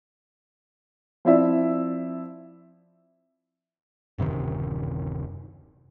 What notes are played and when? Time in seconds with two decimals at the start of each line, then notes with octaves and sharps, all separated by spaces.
1.25 F3 C4 E4 D5 E5
4.18 D1 F#2 C3 D#3